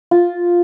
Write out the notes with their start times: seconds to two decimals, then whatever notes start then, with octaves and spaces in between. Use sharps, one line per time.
0.11 F4